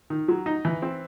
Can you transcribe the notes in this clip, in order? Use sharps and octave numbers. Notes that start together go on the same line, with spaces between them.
D#3
F#3
D#4
E3
C4